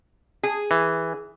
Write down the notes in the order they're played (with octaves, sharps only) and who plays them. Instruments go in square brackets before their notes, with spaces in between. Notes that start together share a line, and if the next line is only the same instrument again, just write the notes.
[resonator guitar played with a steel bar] G#4
[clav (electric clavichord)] E3